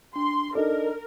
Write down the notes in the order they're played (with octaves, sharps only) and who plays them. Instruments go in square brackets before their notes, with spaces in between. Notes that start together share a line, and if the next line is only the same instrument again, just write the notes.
[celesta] D4 [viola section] C6
[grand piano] D4 D#4 [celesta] A4 [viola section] A#4